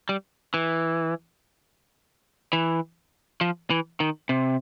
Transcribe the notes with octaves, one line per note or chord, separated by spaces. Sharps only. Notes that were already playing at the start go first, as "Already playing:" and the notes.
G3
E3
E3
F3
E3
D#3
C3